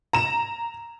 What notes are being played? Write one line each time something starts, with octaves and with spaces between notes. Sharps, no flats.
A#5 E7